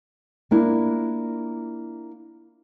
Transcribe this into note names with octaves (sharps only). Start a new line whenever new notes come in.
A#3 D4 E4 F4